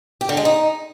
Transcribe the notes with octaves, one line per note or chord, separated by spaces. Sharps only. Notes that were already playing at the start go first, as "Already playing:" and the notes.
G4
D3
G#3
D#4